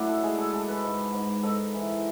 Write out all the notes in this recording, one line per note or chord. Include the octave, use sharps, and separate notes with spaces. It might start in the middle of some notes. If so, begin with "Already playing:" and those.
Already playing: A2 F#3 A3 D4 E4
A4
G#3 G#4
A4
G#3 A4
B4
G#2
G#2
G#2 A4
E3